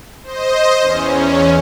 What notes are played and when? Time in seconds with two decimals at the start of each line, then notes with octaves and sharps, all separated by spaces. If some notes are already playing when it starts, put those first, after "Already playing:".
0.23 C5 D#5
0.81 E2 C#4